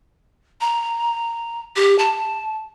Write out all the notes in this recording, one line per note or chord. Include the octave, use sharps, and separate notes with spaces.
A#5
G4
A5